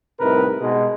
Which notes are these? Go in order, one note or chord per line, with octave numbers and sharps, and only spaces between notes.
C2 A2 C3 D#4 A#4 B4
G#2 B2 G#3